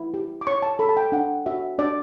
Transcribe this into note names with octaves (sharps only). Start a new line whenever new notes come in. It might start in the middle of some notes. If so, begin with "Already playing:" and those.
Already playing: E4
G4
D6
C#5 C#6
A5
A4 B5
A5
G5
D4 F#5
F#4 E5
D4 D5